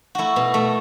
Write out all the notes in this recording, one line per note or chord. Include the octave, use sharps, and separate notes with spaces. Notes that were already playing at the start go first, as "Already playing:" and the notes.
A3 E4 F#4
B2
A3